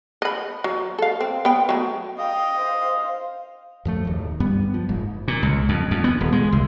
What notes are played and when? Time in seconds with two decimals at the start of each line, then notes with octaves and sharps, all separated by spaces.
0.22 D#5 B5
0.64 F#3
0.98 A4 F5
1.21 C4
1.45 B3 G5
1.69 F#3 G3 A3
2.19 D#5 F5 G5
2.59 C5 F5
3.85 F#2 F3 A3
4.05 D1 D#2
4.40 G2 G3 B3
4.74 F3
4.89 F#1 G#2
5.28 A#2
5.43 C#2
5.69 F2
5.91 F2
6.04 B3
6.20 D#1
6.33 G#3
6.52 C2